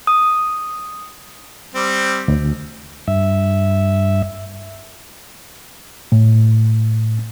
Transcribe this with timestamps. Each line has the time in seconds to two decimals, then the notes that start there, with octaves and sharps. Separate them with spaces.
0.07 D#6
1.74 G3 C4
2.28 D2
3.08 G2 E5
6.12 A2